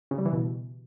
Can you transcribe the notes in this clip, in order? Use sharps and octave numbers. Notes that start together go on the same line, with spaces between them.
C#3
G3
E3
B2